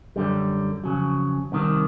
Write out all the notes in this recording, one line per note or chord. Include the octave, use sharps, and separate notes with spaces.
F#2 D3 G3
F2 C#3 F#3
C2 C3 D#3